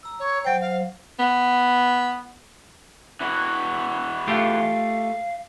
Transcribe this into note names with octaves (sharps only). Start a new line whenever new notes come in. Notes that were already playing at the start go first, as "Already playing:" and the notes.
A#5 E6
C#5
F#3 C5 G5
F5
B3
E3 F#4
A3 F4 G4 F5